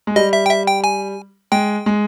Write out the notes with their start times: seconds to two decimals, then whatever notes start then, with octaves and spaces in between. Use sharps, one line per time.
0.07 G#3
0.16 G3 D#5
0.33 E5
0.46 G5
0.50 E5
0.67 G5
0.84 G#5
1.52 G#3 G5
1.86 G#3